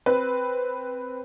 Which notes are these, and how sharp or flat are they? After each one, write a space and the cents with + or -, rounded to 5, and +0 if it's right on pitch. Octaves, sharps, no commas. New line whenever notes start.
C4 +0 B4 +0